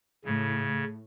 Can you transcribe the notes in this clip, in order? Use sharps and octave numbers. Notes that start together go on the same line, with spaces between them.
A2 C#3